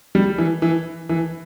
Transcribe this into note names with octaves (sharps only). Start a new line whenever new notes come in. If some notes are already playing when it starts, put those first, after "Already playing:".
G3
E3
E3
E3